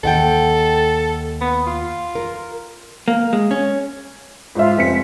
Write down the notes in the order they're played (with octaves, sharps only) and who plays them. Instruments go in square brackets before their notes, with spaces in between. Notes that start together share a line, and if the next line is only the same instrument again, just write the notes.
[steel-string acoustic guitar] D#2 F#5 G5 [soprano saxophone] A4
[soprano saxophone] B3
F4
[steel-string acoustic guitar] A#4
[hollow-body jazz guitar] A#3
G#3
C#4
[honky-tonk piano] G#2 C5 E5 [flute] F4
[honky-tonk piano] F1 C4 C#7 [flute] B6